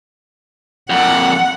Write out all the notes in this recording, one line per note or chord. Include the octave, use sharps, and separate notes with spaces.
F2 A#2 F#5